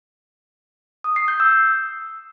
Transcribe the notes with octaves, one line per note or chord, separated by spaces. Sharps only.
D#6
C7
G6
E6